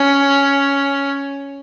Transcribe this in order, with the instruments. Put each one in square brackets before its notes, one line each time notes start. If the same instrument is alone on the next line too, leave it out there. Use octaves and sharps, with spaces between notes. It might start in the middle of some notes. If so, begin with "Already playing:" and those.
Already playing: [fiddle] C#4